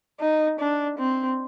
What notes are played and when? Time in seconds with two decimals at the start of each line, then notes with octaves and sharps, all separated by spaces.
0.20 D#4
0.60 D4
0.99 C4